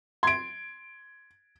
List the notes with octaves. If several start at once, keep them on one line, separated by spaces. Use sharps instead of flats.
C6 G#6 D7